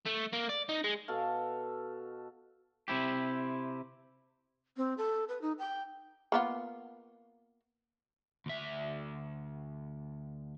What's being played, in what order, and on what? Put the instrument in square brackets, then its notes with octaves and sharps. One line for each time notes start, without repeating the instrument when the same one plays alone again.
[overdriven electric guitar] A3
A#3
D5
D#4
G#3
[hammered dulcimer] B2 F#4 A4 F5
[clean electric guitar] C3 E4 G4
[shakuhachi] C4
A4
B4
D#4
G5
[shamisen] A#3 B3 F4
[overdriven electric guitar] D2 E5